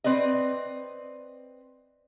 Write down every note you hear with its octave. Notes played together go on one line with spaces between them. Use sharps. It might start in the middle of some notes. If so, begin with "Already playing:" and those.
C4 B4 D5 D#5